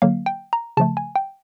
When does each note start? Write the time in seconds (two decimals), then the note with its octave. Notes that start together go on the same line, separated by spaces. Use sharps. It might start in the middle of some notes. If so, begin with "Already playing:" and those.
0.02 D3 F#3 A#3 F5
0.26 G5
0.53 A#5
0.77 C#3 F3 A3 A5
0.97 G#5
1.16 G5